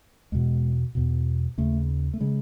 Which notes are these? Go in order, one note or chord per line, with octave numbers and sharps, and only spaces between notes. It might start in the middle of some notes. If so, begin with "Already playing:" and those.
E2 B2 G#3
E2 B2
D#2 C#3 A3
A3
C#3 G#3